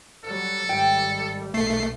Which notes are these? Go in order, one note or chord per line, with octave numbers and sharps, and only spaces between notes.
F#3 G3 A4
G#1 G3 G5
B1 A#2 A3 C7